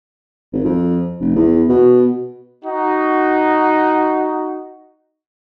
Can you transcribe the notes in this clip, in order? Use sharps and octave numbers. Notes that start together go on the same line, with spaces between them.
G#1
F2
F1
E2
B2
D#4 F#4